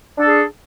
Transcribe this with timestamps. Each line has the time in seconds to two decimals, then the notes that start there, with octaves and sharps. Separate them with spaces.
0.17 D4
0.21 A4
0.24 G#4